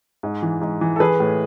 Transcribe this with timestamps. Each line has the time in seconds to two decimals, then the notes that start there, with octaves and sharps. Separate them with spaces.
0.23 G#2
0.43 E3
0.61 G#2
0.81 E3
0.96 A4
1.00 E3 G#4 B4
1.20 A2